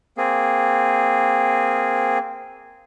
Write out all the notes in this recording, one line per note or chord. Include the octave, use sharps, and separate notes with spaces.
A#3 C4 G#4